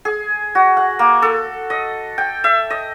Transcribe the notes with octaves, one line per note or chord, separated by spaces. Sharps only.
G#4
F#4
F#5
A#3
A4
D#5
G5
E5
D#5